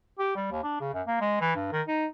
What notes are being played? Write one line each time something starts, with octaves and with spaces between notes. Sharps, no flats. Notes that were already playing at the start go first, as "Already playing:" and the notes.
G4
G3
D#2
D4
C#3
F#2
A#3
G#3
E3
G2
D#3
D#4